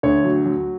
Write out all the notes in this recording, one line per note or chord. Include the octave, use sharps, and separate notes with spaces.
D2 C#5
F#3
F#3